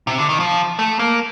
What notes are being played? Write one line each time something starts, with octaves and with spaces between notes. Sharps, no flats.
C3
D3
D#3
F3
A3
A#3